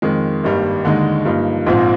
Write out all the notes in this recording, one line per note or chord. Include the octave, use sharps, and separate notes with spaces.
F2 D#3 G#3
G#1 G2 D#3 G3 A#3
D#2 D3 G#3 D#4
G2 F3 A#3 D#4
A#1 G#2 F3 C4 F4